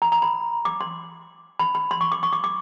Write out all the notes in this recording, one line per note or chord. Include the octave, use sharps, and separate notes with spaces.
A#5
A#5
B5
D6
C6
B5
B5
C6
C#6
D6
C#6
D6
D6